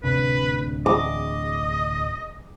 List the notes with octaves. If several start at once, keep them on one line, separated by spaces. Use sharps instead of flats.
D1 C3 D4 B4
D#5 D6